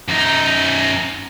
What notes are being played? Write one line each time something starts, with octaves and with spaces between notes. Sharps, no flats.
F#2 D#4